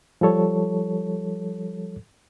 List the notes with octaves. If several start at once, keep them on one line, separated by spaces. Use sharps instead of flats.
F3 G3 A4 C#5